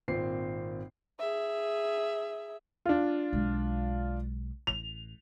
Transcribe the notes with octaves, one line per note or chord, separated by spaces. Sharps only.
G#1 A#2 C4 C7
G#4 E5
D4 F4
B1 G#3
A1 F7